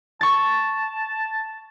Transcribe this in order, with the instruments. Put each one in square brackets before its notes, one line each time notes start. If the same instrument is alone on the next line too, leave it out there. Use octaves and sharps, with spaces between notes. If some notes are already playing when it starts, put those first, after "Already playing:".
[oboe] A5 [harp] C#6 A6